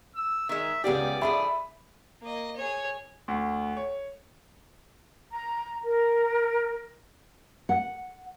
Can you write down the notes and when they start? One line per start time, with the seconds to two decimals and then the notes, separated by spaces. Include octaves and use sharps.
0.15 E6
0.49 D#3 G#3 E5
0.84 C#2 G3 B3 G4 G#4 D5
1.21 D3 F3 G#4 E5 B5
2.23 A#3 D#5
2.57 G#4 C#5
3.28 D2
3.77 C#5
5.31 A#5
5.86 A#4
7.69 F#5